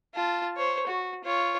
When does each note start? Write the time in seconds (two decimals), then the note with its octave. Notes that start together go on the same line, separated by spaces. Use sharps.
0.15 F4 A5
0.56 C5 C#5
0.86 F#4
1.24 F4 C#5